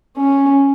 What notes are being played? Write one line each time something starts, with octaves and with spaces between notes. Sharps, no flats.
C#4